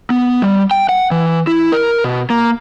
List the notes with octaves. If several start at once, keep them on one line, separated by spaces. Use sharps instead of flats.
B3
G3
G5
F#5
E3
E4
A#4
B2
A#3